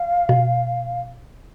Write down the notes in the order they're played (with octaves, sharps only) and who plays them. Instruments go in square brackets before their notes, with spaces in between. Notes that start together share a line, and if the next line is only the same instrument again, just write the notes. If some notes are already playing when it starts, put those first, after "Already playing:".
Already playing: [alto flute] F5
[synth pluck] B2